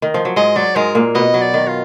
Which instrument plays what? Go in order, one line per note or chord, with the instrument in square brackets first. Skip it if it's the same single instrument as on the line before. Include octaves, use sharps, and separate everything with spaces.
[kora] D#3
F3
F#3
[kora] G#2 G#3 [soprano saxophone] D#5
[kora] F#3 [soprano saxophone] D5
[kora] G#2 G#3 [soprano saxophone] A#4
[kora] A#2 A#3
[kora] B2 B3 [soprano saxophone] D#5
[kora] F#3
[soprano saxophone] D5
[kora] D#3
[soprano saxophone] F4